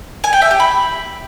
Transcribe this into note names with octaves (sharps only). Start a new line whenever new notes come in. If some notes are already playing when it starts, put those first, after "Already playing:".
G#5
G5
E5
G4
B5